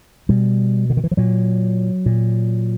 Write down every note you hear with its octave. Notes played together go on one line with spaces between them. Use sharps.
B2 G3
D3
D#3
E3
F3
A#2 F#3
A#2